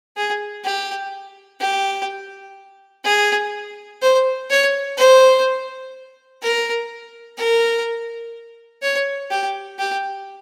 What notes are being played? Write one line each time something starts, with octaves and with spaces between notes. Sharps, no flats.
G#4
G4
G4
G#4
C5
C#5
C5
A#4
A#4
C#5
G4
G4